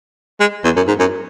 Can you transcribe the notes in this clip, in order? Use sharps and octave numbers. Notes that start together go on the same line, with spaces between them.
G#3
E2
F#2
G#2
F#2